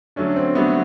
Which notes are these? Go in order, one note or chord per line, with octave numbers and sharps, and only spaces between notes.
D3 F#3 A3 C#4 D4
C4
D3 F#3 A3 B3 D4